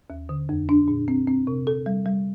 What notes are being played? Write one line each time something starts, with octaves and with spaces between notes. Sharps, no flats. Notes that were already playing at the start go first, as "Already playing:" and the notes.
D#2
D3
F2
D4
A#2
C4
C4
C3
A4
G3
G3